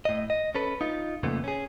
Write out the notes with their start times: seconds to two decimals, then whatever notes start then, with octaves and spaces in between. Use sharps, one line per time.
0.05 A2 D#5
0.30 D#5
0.55 C#4 A4 B4
0.81 D#4 F4
1.23 F2 A#2 C#3 A3 B3
1.44 C#4 G#4